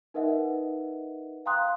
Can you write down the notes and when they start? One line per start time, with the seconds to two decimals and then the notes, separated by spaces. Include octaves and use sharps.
0.14 D#4 A#4 B4 D#5 E5 F#5
1.46 F5 G5 A#5 C6 D#6 F#6